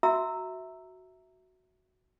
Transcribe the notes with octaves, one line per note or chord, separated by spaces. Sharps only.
F#4 E5 A#5 E6